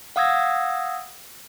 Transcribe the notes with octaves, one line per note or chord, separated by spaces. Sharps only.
F5 F#5 D#6 E6 G#6 A#6